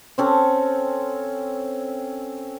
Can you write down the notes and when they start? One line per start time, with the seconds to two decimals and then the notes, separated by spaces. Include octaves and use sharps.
0.18 C4 C#4 A4